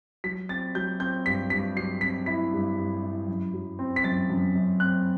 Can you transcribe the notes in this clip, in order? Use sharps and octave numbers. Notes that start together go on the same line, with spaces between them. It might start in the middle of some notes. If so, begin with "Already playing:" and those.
F#3 B6
C4 A6
F#3 G6
C4 G6
G2 B6
G2 B6
F#3 C7
C4 B6
E4 B6
G2
G2
E4
F#2
F#3
C4
B6
F#2 A6
F#2
F#2
C4 F#6